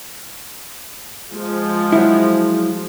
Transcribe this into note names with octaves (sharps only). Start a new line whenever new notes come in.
F3 G#3
F#3 E4